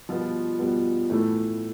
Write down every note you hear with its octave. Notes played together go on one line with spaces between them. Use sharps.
B2 F3 G3 B3 F4
B2 G3 B3
A2 E3 A3